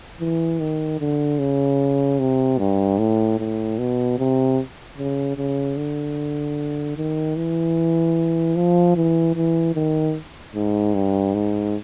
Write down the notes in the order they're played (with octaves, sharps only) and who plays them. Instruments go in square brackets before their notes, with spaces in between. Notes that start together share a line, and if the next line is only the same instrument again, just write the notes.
[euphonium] E3
D#3
D3
C#3
C3
G2
A2
A2
B2
C3
C#3
C#3
D3
D#3
E3
F3
E3
E3
D#3
G#2
G2
G#2